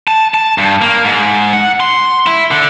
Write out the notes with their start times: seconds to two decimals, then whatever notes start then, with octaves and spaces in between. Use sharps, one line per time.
0.08 A5
0.34 A5
0.58 G2
0.81 A#3
1.04 G#2
1.53 F#5
1.80 C6
2.26 E4
2.51 D3